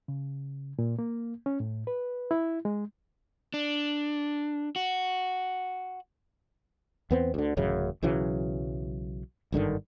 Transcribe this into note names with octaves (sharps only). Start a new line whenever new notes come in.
C#3
A#2
A#3
C#4
A2
B4
E4
G#3
D4
F#4
E2 B3 C4
D2 D3
D1 A1 F#2 C#3
B1 C#3 E3 F#3
G#1 G2 D3 D#3